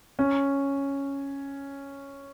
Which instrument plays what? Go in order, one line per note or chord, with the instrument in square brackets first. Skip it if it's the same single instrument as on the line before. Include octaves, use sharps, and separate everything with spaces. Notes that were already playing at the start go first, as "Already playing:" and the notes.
[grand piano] C#4